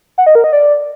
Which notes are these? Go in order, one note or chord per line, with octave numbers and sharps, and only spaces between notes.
F#5
D#5
A#4
D#5
D5